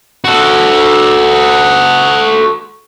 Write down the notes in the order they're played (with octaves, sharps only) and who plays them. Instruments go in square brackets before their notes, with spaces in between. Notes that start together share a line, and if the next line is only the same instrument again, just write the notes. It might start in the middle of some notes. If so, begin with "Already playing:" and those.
[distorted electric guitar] F#4 A4